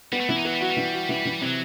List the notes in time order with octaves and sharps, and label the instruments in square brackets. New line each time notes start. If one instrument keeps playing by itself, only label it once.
[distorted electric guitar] G3 [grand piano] B3
[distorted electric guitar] A3
[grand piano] E3 [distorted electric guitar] E4
[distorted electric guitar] D#4
[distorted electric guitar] F#3 [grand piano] B3
[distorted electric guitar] G3
[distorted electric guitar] F#3 [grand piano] F#4
[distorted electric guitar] G3
[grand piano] E3
F#4
E3
E3
[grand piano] C3 [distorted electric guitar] F#3